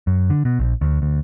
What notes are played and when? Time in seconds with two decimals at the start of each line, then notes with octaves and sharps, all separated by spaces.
0.07 F#2
0.30 D3
0.45 B2
0.59 A#1
0.81 D2
1.02 D2